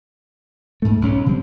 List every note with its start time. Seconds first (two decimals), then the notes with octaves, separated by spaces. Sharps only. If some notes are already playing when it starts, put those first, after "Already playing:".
0.82 G#2 A3
1.02 B1 C#4
1.26 C#3 F#3 G3 C4